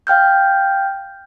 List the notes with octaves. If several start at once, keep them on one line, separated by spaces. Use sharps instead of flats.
F5 G5 F6 G6